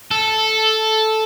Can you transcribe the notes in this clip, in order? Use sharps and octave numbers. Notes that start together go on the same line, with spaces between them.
A4